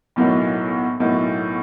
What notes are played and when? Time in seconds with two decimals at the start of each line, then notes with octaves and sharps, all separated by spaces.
0.16 B1 A2 F#3 A#3 D#4
1.00 B1 A2 F#3 A#3 D#4